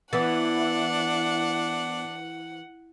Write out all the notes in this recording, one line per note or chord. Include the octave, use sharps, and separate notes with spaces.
E3 B3 D4 F#5 A6